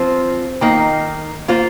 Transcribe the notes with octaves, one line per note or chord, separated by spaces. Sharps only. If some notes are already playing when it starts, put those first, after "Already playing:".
Already playing: F3 C4 F4 C5
D#3 A#3 D#4
A#3 F4 C5